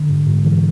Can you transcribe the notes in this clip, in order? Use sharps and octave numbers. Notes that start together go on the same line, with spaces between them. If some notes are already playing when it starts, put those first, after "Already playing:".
Already playing: D3
G#2
G#2
E3